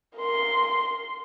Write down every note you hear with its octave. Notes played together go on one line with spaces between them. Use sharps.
A#4 C6